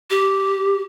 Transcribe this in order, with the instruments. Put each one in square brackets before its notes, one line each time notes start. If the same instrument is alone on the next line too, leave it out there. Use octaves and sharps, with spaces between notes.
[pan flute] G4